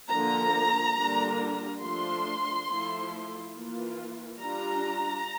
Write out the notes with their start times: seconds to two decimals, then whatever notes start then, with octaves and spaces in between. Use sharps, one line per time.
0.11 D3 F3 A#3 A#5
0.98 D3 G3 A#3 D4 F4
1.83 F3 A3 D4 F4 C6
2.69 F3 A3 E4
3.55 E3 A#3 F4
4.41 G3 D4 F4 A#5